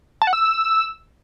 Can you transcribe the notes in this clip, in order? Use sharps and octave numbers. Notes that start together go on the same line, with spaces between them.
A5
F#5
E6